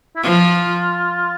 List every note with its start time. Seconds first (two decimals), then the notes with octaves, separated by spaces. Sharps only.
0.16 E4
0.23 F3 F4